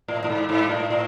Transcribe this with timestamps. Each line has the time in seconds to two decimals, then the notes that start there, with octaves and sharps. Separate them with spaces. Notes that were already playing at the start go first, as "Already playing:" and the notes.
0.08 A2
0.24 A2
0.30 G#2
0.49 G#2
0.69 A2
0.90 A2